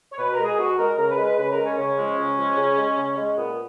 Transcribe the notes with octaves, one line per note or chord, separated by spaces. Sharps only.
C#5
B2 B4
A#4
G#3
G#4
B2 F#4
G#3 A#4
C#3 A#4
B4
G#3
B4
C#3 B4
A#4
G#3
C#4
C#3 C#4
F3 G#3
C#3
F3 G#3
C#3
G#3
C#3
G#3
A#2 B3